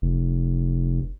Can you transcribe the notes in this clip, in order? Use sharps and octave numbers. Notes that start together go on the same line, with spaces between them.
F1